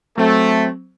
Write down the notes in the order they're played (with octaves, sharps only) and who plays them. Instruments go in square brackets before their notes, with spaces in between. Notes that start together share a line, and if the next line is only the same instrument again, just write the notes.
[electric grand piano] F#3 C4 [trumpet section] A3